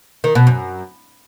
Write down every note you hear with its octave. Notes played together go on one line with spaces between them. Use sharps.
D#3
B2
F#2